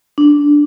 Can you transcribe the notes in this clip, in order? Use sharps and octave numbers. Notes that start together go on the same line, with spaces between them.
D4